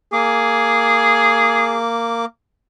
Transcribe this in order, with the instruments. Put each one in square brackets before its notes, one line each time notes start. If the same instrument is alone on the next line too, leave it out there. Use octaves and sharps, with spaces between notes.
[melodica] A#3 D6 [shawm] G#4